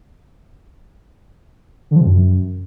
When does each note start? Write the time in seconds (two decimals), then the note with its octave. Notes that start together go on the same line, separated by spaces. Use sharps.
1.91 D3
1.96 F3
2.01 C3
2.06 F#2